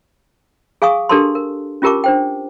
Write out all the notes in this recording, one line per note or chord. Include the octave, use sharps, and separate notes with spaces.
G#4 F5 G#5 C#6 D#6
D4 G4 A4 A#4 A5 C6
A#4
C#4 F4 G4 A#4 A5 D6
D4 C5 G5